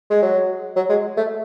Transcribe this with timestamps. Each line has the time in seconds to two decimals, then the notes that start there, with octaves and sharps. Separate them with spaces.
0.10 G#3
0.22 F#3
0.76 F#3
0.89 G#3
1.17 A3